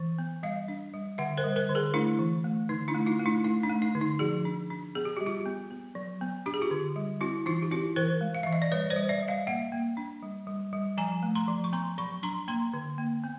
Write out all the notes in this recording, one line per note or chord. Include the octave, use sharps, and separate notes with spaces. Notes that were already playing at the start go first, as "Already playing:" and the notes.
Already playing: E3
B3
G3 D#5 F5
D4
G3
D3 E5 F#5
A#4 C5
G3
A#4 C5
D3
G#4 A#4
A3 D4 E4
E3
A3
D3 D#4
D4 E4
A3
D#4 F4
A3
D4 E4
A3 D#4
D4
A3
D#4
D3
D#4
F3 F#4 G#4
D4
D4
B3 G#4
G4
G3 F#4
F4 G4
B3
B3
F#3
B3
D4 G4
G#4
F4 G4
D3
G3
C4 E4 F#4
E3 D#4 F4
G4
C4 E4 F#4
E3 A#4 C5
G#3
F5
E3 E5
D#5
D5
G3 B4 C#5
C5 D5
G3
D5 E5
G3
D#5 F5
A#3 E5 F#5
A#3
D4
G3
G3
G3
F3 G#5 A#5
A3
A#5 C6
F3
C#6
B3 A#5 C6
F#3 B5 C#6
D4 A#5 C6
A#3 A#5 C6
D3
A#3
B3